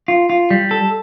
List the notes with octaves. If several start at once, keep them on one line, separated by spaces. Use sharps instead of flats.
F4
F4
G3
A4